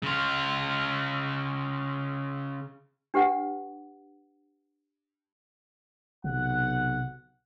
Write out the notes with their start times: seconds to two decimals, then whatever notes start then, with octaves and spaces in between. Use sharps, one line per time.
0.03 C#3 F4
3.14 D4 G4 B4 F#5
6.24 B1 C3 F#5